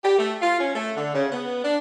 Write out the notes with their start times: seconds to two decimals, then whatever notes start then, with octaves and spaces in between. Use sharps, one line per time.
0.04 G4
0.19 A3
0.42 F4
0.60 C#4
0.75 A3
0.97 D3
1.15 C#3
1.32 B3
1.65 D4